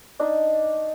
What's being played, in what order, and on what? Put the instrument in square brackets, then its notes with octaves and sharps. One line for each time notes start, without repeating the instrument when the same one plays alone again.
[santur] D4 D#4 D#5